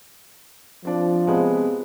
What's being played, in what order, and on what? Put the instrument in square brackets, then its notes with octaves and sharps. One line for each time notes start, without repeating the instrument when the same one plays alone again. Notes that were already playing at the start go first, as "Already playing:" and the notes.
[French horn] F3 [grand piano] C4 D4
[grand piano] C3 G#3 B3